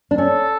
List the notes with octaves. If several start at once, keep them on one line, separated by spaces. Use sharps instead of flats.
D4
C#4 A4